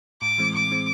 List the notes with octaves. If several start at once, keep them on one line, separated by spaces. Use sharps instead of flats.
A2 D6
E3 G#3 C4
A2 D6
E3 G#3 C4